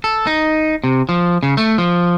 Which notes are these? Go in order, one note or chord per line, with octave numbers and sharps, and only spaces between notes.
A4
D#4
C3
F3
C#3
A3
F3